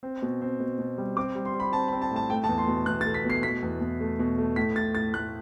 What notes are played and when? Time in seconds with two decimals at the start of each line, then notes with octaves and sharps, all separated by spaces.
0.03 C4
0.22 B2
0.42 C4
0.60 B2
0.79 B2
0.98 G3
1.16 C4 D6
1.35 G3
1.45 C6
1.54 G3
1.60 B5
1.73 C4 A5
1.88 B5
1.93 C4
2.02 A5
2.11 A2
2.16 A5
2.30 A3 G5
2.44 A5
2.49 E2
2.58 C6
2.68 B2
2.86 E2 F#6
3.01 A6
3.06 A3
3.14 B6
3.25 B2 C7
3.43 B2 B6
3.63 E2
3.81 E2
4.00 A3
4.19 B2
4.38 A3
4.56 A2 B6
4.75 A2 A6
4.95 A2 A6
5.13 A2 F#6